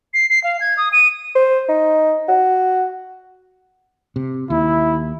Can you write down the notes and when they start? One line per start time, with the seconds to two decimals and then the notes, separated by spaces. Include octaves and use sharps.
0.14 C7
0.29 C7
0.44 F5
0.61 G#6
0.77 D#6
0.93 D#7
1.35 C5
1.69 D#4
2.29 F#4
4.16 C3
4.50 D#2 E4